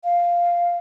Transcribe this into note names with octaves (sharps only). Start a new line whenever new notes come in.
F5